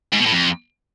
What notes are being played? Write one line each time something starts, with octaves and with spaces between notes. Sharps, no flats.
G#2
B2
A2
F2